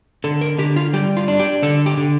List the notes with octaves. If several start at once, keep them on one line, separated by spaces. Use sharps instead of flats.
D3 A4
A#4
D3 G4
F4
G3 G4
F4
D4
G4
D3 A4
G4
D3